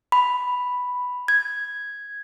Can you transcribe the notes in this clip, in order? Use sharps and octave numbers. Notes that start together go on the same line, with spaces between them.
B5
G#6